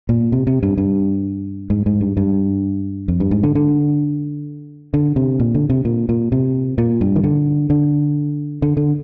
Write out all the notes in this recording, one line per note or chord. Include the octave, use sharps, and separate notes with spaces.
A#2
C3
C3
G2
G2
G#2
G#2
G2
G2
F2
G2
G#2
D3
D3
D3
C3
A#2
D3
C3
A#2
A#2
C3
A#2
G2
D#3
D3
D3
D3
D3